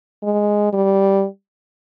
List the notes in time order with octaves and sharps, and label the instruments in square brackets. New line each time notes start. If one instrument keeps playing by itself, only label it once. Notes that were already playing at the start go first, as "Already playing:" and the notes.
[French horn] G#3
G3